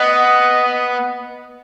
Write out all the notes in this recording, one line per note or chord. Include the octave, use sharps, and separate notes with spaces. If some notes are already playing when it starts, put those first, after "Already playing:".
Already playing: B3 D#5